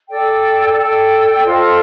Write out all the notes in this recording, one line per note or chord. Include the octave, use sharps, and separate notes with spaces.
A4 D5 G5
A4 D5 G5
F4 A4 C5 D#5